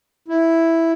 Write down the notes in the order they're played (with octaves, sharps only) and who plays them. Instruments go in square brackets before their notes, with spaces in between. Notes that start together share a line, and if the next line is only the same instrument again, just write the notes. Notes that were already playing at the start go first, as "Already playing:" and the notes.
[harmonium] E4